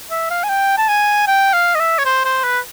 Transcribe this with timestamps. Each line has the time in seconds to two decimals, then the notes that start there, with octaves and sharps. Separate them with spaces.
0.11 E5
0.30 F5
0.44 G#5
0.50 G5
0.78 A5
0.88 G#5
1.27 G5
1.53 F5
1.75 D#5
1.80 E5
1.98 C#5
2.05 C5
2.25 C5
2.44 B4